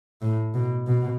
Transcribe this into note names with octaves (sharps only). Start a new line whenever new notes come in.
A2
B2
B2